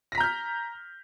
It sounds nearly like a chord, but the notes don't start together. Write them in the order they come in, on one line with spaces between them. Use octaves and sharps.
A#6 B6 A#5 G6 F6